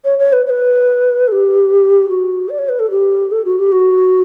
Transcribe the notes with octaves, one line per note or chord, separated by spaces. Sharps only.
C#5
C#5
B4
C#5
B4
A4
G4
F#4
D5
C#5
B4
A4
G4
A4
F#4
G4
F#4